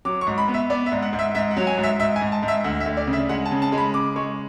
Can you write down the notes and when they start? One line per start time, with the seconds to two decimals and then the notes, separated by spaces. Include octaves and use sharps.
0.05 F#3 D6
0.21 C#6
0.27 G#2
0.38 B5
0.48 B3
0.54 E5
0.70 B3 D5
0.86 E5
0.92 G#2
1.02 F#5
1.13 G#2
1.19 E5
1.35 G#2 E5
1.51 F#5
1.57 F#3
1.67 G#5
1.78 G#2
1.83 E5
1.99 G#2 E5
2.16 G#5
2.21 G#2
2.32 A5
2.43 G#2
2.48 E5
2.64 D2 F#5
2.80 E5
2.86 D2
2.97 D5
3.07 C#3
3.13 E5
3.29 G#3 F#5
3.46 A5
3.51 C#3
3.62 A5
3.72 G#3
3.78 B5
3.94 C#3 D6
4.16 G#3 C#6